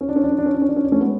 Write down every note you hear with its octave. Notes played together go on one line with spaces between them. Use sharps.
C#4
D4
C#4
D4
C#4
D4
C#4
D4
C#4
D4
C#4
D4
A3 C#4
G#3 B3